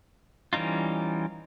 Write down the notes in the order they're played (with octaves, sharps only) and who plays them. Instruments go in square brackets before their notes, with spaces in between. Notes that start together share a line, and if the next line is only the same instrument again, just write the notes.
[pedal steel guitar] E3 G3 C#4 D#4 F4